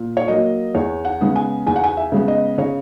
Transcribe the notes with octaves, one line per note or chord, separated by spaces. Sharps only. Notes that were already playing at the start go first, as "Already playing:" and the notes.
Already playing: A#2
C#5
F#3 A#3 D#5
E2 C#5
F#5
C#3 G#3 B3
G#5
E2 G#5
F#5
G#5
E5
C#3 G#3 B3
D#5
C#3 C#5